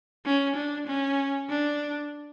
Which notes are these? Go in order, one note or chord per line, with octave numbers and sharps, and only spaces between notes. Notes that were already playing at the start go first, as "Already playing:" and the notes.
C#4
D4
C#4
D4